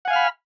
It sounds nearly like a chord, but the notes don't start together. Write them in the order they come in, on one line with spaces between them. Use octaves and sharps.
F#5 G#5 F5 F6 B5